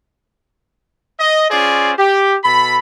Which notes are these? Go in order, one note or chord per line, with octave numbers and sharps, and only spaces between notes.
D#5
C#4 F4 G#4 C5 D5
G4
B2 A4 B5